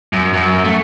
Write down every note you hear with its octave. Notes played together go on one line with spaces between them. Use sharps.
F#2
F#2
A3